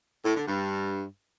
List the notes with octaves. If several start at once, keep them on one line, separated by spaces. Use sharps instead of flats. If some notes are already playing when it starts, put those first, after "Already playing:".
A2
D3
G2